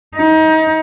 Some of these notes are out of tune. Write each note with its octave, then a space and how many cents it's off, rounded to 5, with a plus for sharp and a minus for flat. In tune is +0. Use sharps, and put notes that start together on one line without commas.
D#4 +30